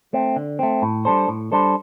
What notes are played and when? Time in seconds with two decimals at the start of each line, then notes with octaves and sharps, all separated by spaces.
0.13 A3 C4
0.36 D3
0.59 A3 C4
0.82 A2
1.05 G3 D4 A4 C5
1.28 A2
1.52 G3 D4 A4 C5